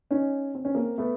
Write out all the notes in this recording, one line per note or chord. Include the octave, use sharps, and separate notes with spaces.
C#4 D#4
C4
C#4
A#3 C4
A3 B3